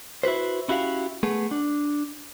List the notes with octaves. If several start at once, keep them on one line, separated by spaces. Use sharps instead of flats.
E4 F#4 B4 C5
C#4 E4 F#4 G4 F5
A3 B3 G#4
D4